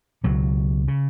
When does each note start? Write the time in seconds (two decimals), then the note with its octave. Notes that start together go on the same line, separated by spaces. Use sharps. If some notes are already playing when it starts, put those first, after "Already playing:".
0.24 C#2 B2 F#3
0.88 C#3